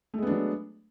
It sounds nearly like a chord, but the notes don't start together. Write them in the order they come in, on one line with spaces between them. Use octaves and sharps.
A3 G#3 B3 D4 F#3